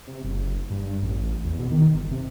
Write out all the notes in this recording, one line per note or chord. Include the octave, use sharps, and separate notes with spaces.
C3
F#1
G2
A1
E2
B2
D#3
G1
C3